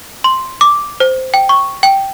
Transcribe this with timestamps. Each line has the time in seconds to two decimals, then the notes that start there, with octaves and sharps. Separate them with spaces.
0.24 C6
0.61 D6
1.00 C5
1.34 G5
1.49 C#6
1.83 G5